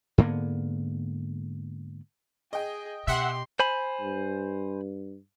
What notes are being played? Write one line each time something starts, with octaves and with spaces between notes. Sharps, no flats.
G#2 D3 A#3 B3
G#4 D#5 G5
B2 G4 E5 F#5 C6
C5 G#5 B5
G2